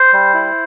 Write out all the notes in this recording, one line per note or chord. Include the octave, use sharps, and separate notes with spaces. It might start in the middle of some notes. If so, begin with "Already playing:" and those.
Already playing: C5
G3
E4